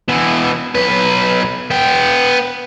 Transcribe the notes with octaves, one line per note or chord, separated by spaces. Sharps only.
B2 E3
B1 B4
B3 G5